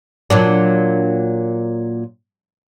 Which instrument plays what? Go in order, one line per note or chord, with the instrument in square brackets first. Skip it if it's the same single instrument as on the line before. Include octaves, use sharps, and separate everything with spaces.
[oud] A#2 F#3 D4